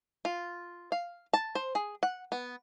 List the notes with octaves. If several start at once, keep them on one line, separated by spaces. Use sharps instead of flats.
F4
F5
A5
C5
G#4
F#5
B3